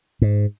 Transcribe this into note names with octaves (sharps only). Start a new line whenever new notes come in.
G#2